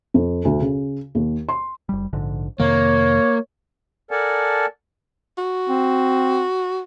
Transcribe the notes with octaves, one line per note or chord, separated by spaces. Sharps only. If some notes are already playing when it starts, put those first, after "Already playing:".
F2
D2
C#3
D#2
C6
F#1 G3
A#1 G#2 D3
F2 C3 D#3 A#3 C#5
A4 A#4 D5 F#5 G#5 A5
F#4
C4